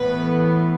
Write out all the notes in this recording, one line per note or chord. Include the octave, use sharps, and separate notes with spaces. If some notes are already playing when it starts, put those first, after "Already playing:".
Already playing: A2 E3 B3 B4